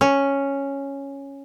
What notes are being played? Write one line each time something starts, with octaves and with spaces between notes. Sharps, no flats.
C#4